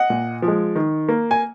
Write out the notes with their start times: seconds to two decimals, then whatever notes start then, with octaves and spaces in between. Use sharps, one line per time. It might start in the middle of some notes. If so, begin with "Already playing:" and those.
Already playing: D#5 F#5
0.10 A#2
0.42 F3
0.48 G#3
0.76 D#3
1.09 A#3
1.31 G#5